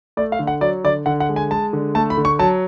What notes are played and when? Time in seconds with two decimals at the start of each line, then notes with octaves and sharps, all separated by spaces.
0.17 A3 D5
0.32 F5
0.39 D3
0.47 F#5
0.61 F#3 D5
0.84 D3 D5
1.06 D3 F#5
1.20 F#5
1.29 G#3
1.36 G#5
1.51 G#3 A5
1.73 D3
1.95 A3 A5
2.10 B5
2.17 D3
2.25 C#6
2.39 F#3 A5